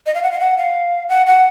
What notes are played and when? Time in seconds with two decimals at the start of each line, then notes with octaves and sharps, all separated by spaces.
0.06 D#5
0.15 F5
0.23 F#5
0.32 F5
0.40 F#5
0.58 F5
1.09 F#5
1.26 F#5